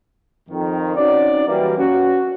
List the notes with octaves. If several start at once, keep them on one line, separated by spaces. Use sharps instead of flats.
F2 D#3
C4 C#4 D#4 F#4 D5
E3 F#3 G3 A#3
C#4 F#4